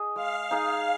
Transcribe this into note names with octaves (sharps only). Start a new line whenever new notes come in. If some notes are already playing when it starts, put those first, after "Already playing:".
Already playing: G#4 D#5
G#3 F5
D#4 G#4 D#5